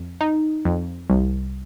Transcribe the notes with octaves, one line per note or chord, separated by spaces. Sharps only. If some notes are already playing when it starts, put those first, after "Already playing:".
Already playing: F2
D#4
F2
C2